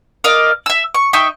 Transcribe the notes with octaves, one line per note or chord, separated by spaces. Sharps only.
A#4 D5 D#5 F5
E5 E6
C#6
D#4 E5 G5 C#6